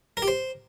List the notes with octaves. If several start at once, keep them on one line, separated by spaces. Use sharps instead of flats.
A#4
G4
C5